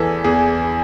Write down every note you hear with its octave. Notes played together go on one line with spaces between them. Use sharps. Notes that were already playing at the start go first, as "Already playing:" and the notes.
Already playing: E2 E3 A4
E2 G#4